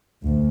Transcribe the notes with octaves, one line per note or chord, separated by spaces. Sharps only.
D2